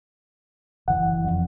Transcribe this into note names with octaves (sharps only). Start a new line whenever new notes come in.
F#1 E3 F#5
F2